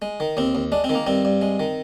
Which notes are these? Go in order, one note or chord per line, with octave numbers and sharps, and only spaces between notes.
G#3
D#3
D#2 C4
D#2
G#3 D4
C4
D#3
A#3
G2 C4
G2
G#3
D#3